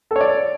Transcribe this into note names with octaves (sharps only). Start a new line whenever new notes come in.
A4 C#5 D5